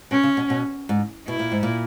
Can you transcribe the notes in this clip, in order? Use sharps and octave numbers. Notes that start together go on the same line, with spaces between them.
B2 C#4
C#3
B2
B2
G#2
B2 E4
A#2
G#2
A#2